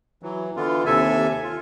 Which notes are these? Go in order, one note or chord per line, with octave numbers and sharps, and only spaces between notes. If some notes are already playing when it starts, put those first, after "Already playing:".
E3 F#3
D3 E3 B3 F4
D#2 C3 A4 E5 G#5
F4